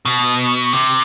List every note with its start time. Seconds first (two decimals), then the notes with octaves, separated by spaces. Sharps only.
0.05 B2
0.73 C3